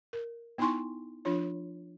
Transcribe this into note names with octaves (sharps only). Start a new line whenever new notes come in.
A#4
B3 D#4 E4 G#5 C6 C#6
F3 D4 F4 C#5